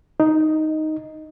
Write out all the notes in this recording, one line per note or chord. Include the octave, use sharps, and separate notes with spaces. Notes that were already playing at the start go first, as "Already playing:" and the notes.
D#4